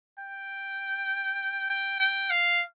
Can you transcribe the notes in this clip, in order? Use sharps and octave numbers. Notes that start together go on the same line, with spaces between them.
G5
G5
G5
F5